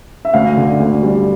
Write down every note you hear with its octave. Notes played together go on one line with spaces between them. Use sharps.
E5
D2 F5
D3
D2
G3